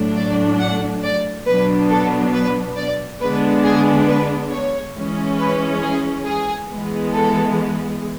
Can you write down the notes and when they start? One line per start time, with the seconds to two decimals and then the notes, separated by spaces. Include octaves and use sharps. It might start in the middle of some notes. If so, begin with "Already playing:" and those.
Already playing: A2 F#3 A3 D4
0.16 D5
0.59 F#5
1.03 D5
1.46 B2 F#3 B3 D4 B4
1.90 A4
2.33 B4
2.77 D5
3.20 D3 G#3 B3 D4 B4
3.64 G#4
4.08 B4
4.51 C#5
4.94 E3 G#3 C#4
5.38 B4
5.81 G#4
6.25 G#4
6.68 E3 G#3 B3
7.12 A4